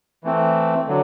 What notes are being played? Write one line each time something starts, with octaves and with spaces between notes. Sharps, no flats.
E3 A3 C4
D3 F#3